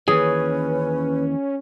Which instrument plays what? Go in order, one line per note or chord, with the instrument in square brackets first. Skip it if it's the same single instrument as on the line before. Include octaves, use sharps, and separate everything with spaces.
[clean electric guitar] D#2 E3 [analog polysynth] C#4 [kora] G#4 [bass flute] B4